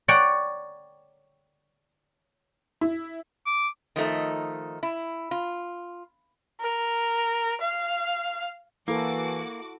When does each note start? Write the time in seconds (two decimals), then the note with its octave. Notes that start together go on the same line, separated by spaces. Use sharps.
0.08 C#5 D5 F#5 G5 A#5
2.81 E4
3.46 D6
3.96 D#3 F3 A3 D#4
4.83 E4
5.31 F4
6.61 A#4
7.61 F5
8.88 E3 A#3 E4 F#4 A4 D6